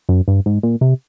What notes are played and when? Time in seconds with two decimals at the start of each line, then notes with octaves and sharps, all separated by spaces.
0.09 F#2
0.28 G2
0.46 G#2
0.63 A#2
0.81 C3